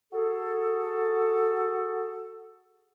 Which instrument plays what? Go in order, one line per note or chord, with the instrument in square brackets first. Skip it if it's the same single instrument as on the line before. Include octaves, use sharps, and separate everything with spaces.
[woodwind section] F#4 G#4 A4